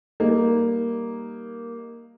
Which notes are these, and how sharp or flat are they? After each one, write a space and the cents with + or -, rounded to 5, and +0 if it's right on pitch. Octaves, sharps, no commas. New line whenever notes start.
G3 +0 A#3 +0 D#4 +0